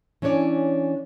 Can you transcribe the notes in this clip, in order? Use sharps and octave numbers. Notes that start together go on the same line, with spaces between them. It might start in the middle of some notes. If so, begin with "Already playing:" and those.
E3 C#4 D4 C#5 D5